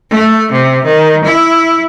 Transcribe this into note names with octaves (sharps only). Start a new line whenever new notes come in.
A3
C3
D#3
E4